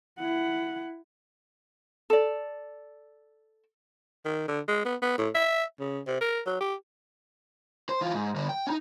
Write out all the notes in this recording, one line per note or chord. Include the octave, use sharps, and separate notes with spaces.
E4 F#5
A4 D5
D#3
D3
G#3
B3
B3
A2
E5
C#3
C3
A#4
F#3
G4
C5
E3 F4
G#2
D3 G3
G5
C#4 D#4